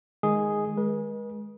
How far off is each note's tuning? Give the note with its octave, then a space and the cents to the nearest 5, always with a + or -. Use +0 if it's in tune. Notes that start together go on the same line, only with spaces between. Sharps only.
D#3 +0 G#3 +0 G#4 +0
G#3 +0 B4 -45